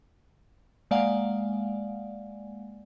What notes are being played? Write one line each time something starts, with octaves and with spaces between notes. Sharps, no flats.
G#3 A#3 D5 F5 F#5 G#5